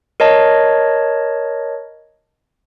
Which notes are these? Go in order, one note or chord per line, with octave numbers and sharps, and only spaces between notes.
A#4 C#5 D#5 A5